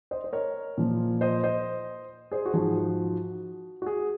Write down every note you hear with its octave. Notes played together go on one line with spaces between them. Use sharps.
C5 D#5
C5
A#4 C#5
A#2 F3
C5 D#5
C5 D#5
G#4 C5
F#4
G#2 F3 G#4
F#4
F#4
G#4